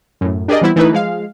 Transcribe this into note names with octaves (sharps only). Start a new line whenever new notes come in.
F#2 A2
D4 G4 G#4 A#4 D5 D#5
E3 G3 B3 C4 E4
E3 A3 D#4 E4 B4
F3 G#3 F5